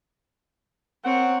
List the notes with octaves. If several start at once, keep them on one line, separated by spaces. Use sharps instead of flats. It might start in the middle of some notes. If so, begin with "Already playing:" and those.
C4 A#4 C#5 F#5